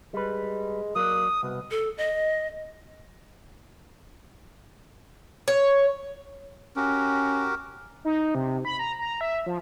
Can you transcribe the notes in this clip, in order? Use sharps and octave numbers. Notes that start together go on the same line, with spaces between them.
G3 G#3 B4
F#3 A#3 D5 D#6
C2 B2
A4
D#5
C#5
C#4 F#4 G4 A#4
D#4
C3
B5
A#5
A#5
E5
F3